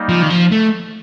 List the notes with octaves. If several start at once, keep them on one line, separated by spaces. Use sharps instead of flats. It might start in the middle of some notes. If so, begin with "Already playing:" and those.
Already playing: G3 A#3 D#4
F3
D#3
F3
A3